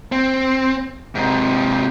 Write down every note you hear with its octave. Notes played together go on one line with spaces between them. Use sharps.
C4
G#2 C3